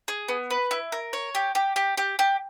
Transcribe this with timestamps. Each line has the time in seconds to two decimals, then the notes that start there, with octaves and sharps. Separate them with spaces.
0.08 G#4
0.28 B3
0.50 B4
0.71 E4
0.92 A#4
1.13 C#5
1.35 G4
1.55 G4
1.76 G4
1.97 G4
2.19 G4